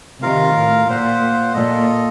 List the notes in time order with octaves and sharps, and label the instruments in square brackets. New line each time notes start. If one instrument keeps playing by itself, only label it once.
[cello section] C3 D#3 [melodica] F4 A#4 F5
[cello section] A2
[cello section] A#2 [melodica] F4 C5 F#5
[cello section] A#2 [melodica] F4 A4 D#5